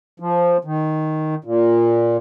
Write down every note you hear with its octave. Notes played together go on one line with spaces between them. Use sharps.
F3
D#3
A#2